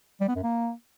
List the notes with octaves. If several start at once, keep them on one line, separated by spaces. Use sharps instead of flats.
G3
B3
F#2
A#3